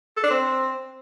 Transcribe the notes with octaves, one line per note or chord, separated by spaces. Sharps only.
A4
D4
C4